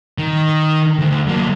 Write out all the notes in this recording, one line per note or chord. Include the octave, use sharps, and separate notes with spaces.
D#3
D2
F#3 A#3